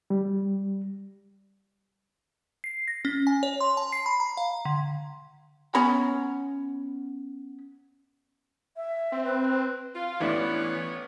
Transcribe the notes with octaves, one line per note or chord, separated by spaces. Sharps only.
G3
C7
A#6
C#4
G#5
C#5
C6
A5
C7
B5
A#5
F5
D3
B3 C#4 A#5 B5
E5
C4
B4
F4
A1 E3 B3 D4 C#5